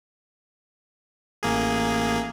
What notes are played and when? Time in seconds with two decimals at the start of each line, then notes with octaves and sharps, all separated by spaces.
1.43 A1 A#3 G#4